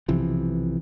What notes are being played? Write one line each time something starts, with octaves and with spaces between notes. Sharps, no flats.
B1 C3 E3 F3